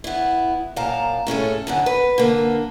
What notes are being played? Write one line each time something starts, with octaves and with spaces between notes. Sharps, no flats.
B3 E4
F#2 A#2 F5 A5 A#5
A2 C#4 G#4 A4
F#2 D3 B3
B4
D3 A#3